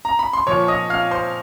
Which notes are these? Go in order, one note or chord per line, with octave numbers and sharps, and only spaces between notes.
A#5
B5
C6
A#2 F3 C#5 C#6
D#5 D#6
F5 F6
C5 C6